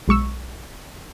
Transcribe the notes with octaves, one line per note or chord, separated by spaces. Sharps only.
B1 G#3 C#6 E6